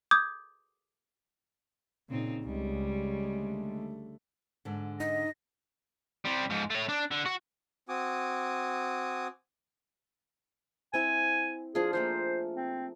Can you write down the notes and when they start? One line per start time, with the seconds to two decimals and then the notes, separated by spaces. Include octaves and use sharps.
0.11 D6 D#6 G6 G#6
2.10 A#2 C#3 C4 D#4
2.43 C#2 C#3 G3 G#3
3.22 D3 A3
4.65 G#2 D3
5.00 D#4 D#5 A#6
6.25 C3 G3
6.50 G#2 F3
6.70 A3 C#5
6.89 D4
7.11 D3
7.25 F#4
7.89 C4 F#4 G#5 D6 D#6
10.94 C4 E4 E5 G#5
11.75 F3 D4 F4 G#4
11.93 A3 A#3 G#4 C5
12.56 C4